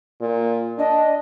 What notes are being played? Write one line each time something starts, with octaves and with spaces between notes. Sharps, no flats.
A#2
D4 D#5